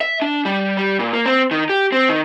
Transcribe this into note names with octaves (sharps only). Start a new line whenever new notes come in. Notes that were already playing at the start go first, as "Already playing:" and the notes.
E5
D4
G3
G3
A#2
A#3
C4
D#3
G4
C4
D#3